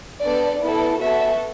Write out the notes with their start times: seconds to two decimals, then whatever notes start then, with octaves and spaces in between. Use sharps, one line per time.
0.23 B3 D4 A4 D5
0.61 B3 E4 A4
1.00 B3 F#4 A4 E5